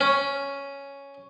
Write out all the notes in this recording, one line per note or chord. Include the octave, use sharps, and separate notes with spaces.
C#4